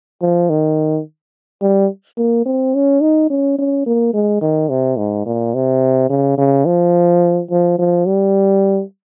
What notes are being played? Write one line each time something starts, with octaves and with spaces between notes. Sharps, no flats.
F3
D#3
G3
A#3
C4
C#4
D#4
C#4
C#4
A#3
G#3
D#3
C3
G#2
A#2
C3
C#3
C#3
F3
F3
F3
G3